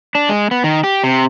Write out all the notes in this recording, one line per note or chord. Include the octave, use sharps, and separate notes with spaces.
D4
G#3
B3
D#3
G4
C3